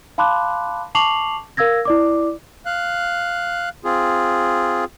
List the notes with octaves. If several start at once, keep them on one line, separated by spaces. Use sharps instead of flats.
F5 A5 B5 C6 D6 F#6
A5 C#6 D6 C7 F7 F#7
A#4 F5 E6 G#6 A#6
E4 D5 D6
F5 F#6
C4 F4 G#4